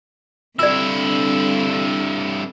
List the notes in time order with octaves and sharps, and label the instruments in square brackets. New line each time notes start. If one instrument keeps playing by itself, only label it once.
[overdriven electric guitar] G2 E4 [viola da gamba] D3 C4 [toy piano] D5 E6